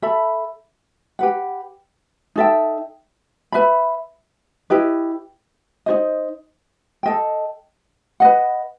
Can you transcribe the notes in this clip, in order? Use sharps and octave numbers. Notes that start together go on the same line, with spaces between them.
A4 E5 B5
G4 B4 F#5
D#4 A4 E5 G5
B4 E5 B5
E4 G4 B4 D#5
D#4 F#4 C5 D#5
A4 D#5 G5
B4 D#5 F#5